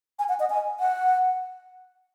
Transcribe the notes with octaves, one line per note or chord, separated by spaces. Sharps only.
G#5
F#5
D#5
G#5
F#5